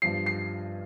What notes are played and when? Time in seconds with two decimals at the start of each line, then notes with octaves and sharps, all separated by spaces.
0.02 G2 F3 C7
0.26 C7